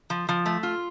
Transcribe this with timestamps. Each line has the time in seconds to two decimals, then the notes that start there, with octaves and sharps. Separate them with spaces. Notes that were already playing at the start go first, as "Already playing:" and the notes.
0.10 F3
0.29 F3
0.46 A3
0.63 F4